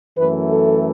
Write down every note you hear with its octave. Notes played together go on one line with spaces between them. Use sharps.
F#2 E3 A3 B4
A4